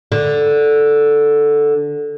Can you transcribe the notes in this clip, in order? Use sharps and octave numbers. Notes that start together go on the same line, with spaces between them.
D3